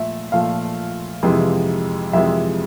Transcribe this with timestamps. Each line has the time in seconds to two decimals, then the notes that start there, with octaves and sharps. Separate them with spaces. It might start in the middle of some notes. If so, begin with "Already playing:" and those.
Already playing: A#2 F3 A3 E5
0.32 A#2 F3 A3 F5
1.23 F2 C3 E3 G#3
2.13 F2 C3 E3 G#3 E5